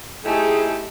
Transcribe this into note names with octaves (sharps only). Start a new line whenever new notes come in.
A3 C4 D#4 E4 G4 G#4